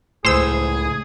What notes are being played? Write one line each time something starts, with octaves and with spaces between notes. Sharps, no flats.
C#2 A2 G#4 C5 E6